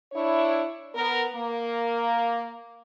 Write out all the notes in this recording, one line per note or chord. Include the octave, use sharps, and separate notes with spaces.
D4 E4 C#5
B3 A#4
A#3